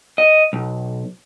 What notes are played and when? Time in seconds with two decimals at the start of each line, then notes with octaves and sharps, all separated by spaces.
0.18 D#5
0.53 B1